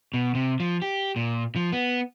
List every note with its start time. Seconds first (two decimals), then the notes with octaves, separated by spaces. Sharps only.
0.14 B2
0.35 C3
0.60 F3
0.82 G4
1.16 A#2
1.56 F3
1.72 B3